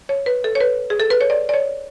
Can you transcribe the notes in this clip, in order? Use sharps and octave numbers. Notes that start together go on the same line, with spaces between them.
C#5
B4
A4
C#5
B4
G#4
A4
B4
C#5
D5
D5
C#5